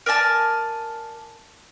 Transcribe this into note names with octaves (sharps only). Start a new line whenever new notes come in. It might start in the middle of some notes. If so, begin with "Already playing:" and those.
A#4 D5 G#5 A5